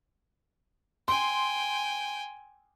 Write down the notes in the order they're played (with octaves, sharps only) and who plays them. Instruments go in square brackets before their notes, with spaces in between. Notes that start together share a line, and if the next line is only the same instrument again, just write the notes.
[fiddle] G5 G#5 [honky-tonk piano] C6